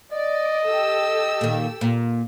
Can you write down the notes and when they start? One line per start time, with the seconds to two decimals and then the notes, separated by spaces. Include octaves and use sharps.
0.12 D5 D#5
0.66 G4 A4 E6
1.41 A#2 D#3
1.81 A#2